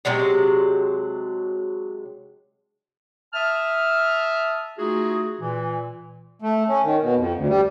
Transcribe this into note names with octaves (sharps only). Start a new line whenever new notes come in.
C3 F#3 G#3 D4
E5 A5 D#6 F6
A3 D#4 F4 F#4 G#4
A#2 E3
A3
C#4
D#3
B2
F2
D2
G3